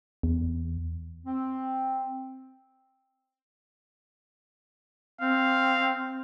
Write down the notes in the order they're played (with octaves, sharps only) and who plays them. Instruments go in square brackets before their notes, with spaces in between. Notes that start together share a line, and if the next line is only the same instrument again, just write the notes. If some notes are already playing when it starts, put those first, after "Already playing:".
[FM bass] E2
[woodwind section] C4
[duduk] C4 [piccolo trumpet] F5